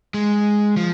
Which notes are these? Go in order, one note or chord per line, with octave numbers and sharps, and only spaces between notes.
G#3
F3